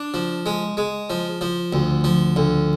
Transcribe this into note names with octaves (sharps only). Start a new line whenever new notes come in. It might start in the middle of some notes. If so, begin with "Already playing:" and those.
Already playing: D4
F3
G#3
G#3
F3
F3
D2
F3
D2